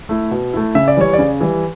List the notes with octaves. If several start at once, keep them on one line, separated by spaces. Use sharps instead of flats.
A3 E4
B2
A3 E4
C#3 E5
D5
E3 G3 C#5
D5
C#3
E3 G3